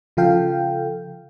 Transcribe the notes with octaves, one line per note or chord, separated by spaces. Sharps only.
C#3 F3 F4 A4 F5 G5